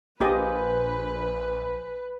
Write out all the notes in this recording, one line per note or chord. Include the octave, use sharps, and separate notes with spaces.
A#1 A#3 G4 B4 C5 D#5 G#5